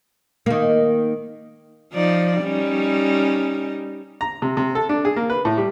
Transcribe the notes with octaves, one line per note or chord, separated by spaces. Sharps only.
D#3 A#3
F3 D#4 D5
G3 C#4 D#4
A#5
C3
C3
A4
D4
G#4
A#3
B4
A2
G3